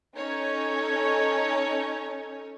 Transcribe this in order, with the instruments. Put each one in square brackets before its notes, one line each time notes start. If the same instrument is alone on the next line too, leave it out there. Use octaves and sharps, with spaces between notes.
[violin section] C#4 D#4 A4 C#5